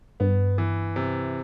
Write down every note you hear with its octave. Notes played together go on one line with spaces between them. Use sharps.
G2 B3
E3
C3